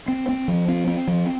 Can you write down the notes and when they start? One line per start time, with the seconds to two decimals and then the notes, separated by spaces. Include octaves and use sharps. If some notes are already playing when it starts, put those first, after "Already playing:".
0.08 C4
0.29 C4
0.48 F3
0.68 C4
0.87 C4
1.07 F3